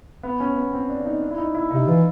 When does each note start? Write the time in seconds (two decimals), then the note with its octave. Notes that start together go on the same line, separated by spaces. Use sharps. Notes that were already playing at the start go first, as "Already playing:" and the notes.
0.23 B3
0.40 C#4
0.56 B3
0.73 C4
0.89 D4
1.00 D4
1.06 D#4
1.22 D4
1.31 E4
1.38 D#4
1.55 E4
1.71 C3 D#4
1.87 E3 F4